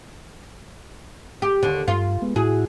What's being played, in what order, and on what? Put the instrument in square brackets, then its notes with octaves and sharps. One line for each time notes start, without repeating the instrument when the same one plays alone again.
[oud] G4
D#2 D3
[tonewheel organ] G2 [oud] F4
[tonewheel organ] G#3 B3
[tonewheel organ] A2 E4 F#4 [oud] G#4